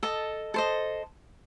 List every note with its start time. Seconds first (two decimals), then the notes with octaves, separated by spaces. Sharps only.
0.03 A4 D#5 A5
0.54 A4 C5 D#5